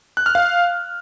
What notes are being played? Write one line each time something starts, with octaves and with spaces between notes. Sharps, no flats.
F#6
F6
F5